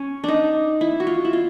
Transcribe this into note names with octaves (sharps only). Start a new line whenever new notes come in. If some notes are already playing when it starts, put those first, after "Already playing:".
Already playing: C#4
D4 D#4
E4
F#4
F4
E4
F4